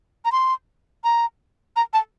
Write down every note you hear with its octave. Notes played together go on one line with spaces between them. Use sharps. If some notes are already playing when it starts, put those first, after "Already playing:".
A#5
C6
A#5
A#5
A5